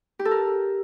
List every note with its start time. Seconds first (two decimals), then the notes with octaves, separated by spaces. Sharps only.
0.19 G4
0.25 A4
0.31 A#4